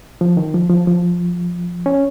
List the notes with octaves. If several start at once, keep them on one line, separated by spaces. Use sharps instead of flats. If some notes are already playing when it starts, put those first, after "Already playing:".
F3
D#3
F3
F3
F3
C#4